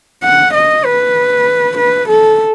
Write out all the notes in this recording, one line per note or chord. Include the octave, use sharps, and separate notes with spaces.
F#5
D#5
B4
B4
A4